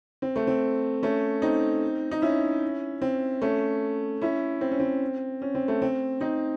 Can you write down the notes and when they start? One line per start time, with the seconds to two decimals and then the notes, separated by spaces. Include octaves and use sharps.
0.22 C4
0.36 A3
0.47 C4
1.03 A3 C#4
1.42 C4 D#4
2.11 D#4
2.22 C#4 E4
3.02 C4
3.42 A3 C#4
4.22 C#4 E4
4.61 C4
4.72 C#4
4.80 C4
5.42 C#4
5.55 C4
5.68 A3
5.82 C4
6.21 C4 D#4